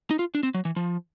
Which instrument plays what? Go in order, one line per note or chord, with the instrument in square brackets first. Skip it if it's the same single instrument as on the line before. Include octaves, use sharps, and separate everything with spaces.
[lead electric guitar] D#4
F4
D4
C4
F#3
E3
F3